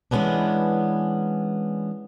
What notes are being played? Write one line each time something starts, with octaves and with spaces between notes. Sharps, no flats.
E3 G#3 A3 B3 C#4 D4